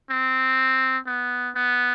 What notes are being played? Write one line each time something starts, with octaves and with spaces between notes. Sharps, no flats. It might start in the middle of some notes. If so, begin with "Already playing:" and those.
C4
B3
B3